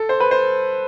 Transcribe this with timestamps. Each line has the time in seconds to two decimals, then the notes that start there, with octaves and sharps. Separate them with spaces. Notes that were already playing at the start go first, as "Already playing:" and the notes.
Already playing: A4
0.09 C5
0.20 B4
0.31 C5